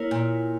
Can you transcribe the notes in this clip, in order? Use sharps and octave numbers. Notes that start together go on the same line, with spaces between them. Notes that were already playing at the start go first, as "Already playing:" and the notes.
Already playing: A#3 E4 A#4 C#5
A#2